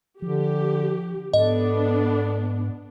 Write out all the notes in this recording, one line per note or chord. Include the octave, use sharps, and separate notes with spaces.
D3 F3 G4
G#2 B3 D4 A4 D#5